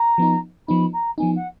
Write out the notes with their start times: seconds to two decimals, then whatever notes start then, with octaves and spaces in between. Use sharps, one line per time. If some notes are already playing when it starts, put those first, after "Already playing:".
Already playing: A#5
0.18 F3 B3 D#4
0.68 F3 B3 D#4 B5
0.93 A#5
1.18 F3 B3 D#4 G#5
1.35 F#5